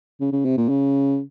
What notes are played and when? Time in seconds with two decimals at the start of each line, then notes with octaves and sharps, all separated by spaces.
0.21 C#3
0.32 C#3
0.45 C3
0.58 A#2
0.69 C#3